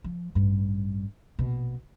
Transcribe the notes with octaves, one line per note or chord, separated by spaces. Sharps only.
F3
A1 G2
A#1 B2